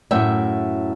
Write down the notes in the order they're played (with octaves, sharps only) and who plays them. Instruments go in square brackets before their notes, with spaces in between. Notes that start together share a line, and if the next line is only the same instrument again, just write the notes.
[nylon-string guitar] F#2 A2 A3 E5 G5